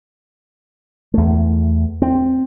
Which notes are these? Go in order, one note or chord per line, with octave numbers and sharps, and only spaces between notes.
E2 A3
C4